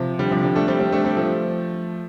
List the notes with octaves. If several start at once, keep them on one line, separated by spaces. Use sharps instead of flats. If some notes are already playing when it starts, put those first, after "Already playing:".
Already playing: C3 F3
D3 G3
C3 F3
D3 G3
A3 D4
G3 C4
G3 C4
A3 D4
G3 C4
F3 A3